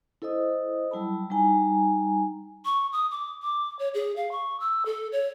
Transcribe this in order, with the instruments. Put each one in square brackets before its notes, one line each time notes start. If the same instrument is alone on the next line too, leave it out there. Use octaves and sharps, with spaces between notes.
[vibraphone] E4 A4 C5 D#5 D#6
F#3 G3 E4 A5 B5
G3 D#4 G#5 A#5
[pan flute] C#6
D#6
D6
D6
C#5
G#4
F5
C#6
E6
A4
C#5